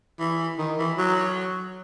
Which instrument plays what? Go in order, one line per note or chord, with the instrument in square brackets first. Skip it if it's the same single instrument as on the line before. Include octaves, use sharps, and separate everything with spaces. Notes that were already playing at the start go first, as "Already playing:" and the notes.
[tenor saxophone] E3
D#3
E3
F#3